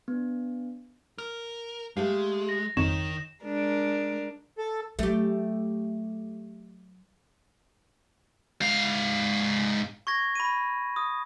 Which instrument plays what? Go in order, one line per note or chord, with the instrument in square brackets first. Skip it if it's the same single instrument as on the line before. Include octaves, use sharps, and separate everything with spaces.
[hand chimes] B3 D4
[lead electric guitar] A#4 [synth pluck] F6
[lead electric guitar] G#3 [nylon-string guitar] A3 G4 F5
[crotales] A#6
[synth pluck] G#1 F2 C#5 [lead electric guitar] D#3 [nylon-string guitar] D#4 [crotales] E7
[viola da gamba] G#3 D4 A#4
[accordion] A4
[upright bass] F#3 [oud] A3 G4
[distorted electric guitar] G#2 F5
[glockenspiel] C#6 G#6 A#6
B5 D#7
D#6